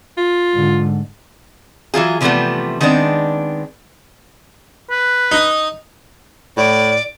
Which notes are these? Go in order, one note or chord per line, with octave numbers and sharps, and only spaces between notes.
F4
G#2 D3
E3 F#3 F4 G#4
C3 E3 F3 G3 A3 B3
D#3 G#3 B3 C4 D4
B4
D#4
A2 D5